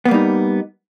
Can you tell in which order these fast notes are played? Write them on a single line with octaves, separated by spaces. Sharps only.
B3 A#3 G3 D#4